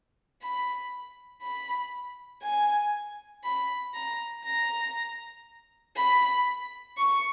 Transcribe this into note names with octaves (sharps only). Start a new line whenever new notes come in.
B5
B5
G#5
B5
A#5
A#5
B5
C#6